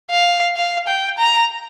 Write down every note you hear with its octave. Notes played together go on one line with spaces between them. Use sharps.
F5
F5
G5
A#5